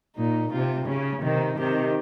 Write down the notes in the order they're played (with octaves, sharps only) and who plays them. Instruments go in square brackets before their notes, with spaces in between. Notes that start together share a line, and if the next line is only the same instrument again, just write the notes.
[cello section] A#2 [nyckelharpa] D#4
[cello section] C3 [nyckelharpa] F4
[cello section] C#3 [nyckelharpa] C#4
[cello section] C3 D#3 [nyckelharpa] D#4
[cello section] C3 D#3 [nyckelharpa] G4